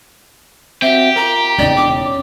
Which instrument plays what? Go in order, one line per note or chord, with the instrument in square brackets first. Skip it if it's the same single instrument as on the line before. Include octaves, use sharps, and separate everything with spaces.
[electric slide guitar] C4 F#4 [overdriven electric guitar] G4 [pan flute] E5
[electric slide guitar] F4 A#4 [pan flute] A#5
[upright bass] E1 [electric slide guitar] E2 C#3 D#4 [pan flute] D5
[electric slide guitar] D4 [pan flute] D6
[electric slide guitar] C#4